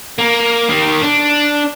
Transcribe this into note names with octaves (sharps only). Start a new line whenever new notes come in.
A#3
D#3 A#3
D4